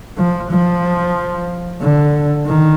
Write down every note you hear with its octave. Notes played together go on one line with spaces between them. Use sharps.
F3
F3
D3
D#3